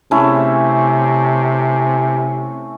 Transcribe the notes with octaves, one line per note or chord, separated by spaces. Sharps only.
C3 A3 C#4 E4